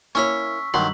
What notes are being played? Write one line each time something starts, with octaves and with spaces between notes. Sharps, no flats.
A#3 C#4 E4 C#5 C#6 E6 B6
E2 G2 D#3 F#3 C6 F#7